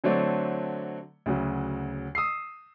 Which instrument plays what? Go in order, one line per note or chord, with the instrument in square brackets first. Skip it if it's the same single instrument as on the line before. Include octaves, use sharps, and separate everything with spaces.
[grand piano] D3 F#3 A3 C4 C#5 D5
D2 C#3 F#3
D#6 E6 C7